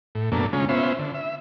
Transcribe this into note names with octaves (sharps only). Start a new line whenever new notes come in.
A2
F#2 B2 A3 A#3 D4
C#3 G#3 C#4 F4
B3 C#4 F4 C5 E5
D3
E5